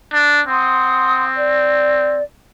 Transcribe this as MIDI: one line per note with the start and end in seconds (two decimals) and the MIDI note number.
0.13 0.41 62
0.47 2.20 60
0.47 1.25 78
0.47 1.25 84
0.47 1.25 87
1.36 2.21 74